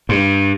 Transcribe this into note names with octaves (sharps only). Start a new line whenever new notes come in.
G2